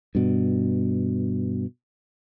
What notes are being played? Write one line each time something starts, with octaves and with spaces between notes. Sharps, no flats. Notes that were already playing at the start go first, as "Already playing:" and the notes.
G2 B2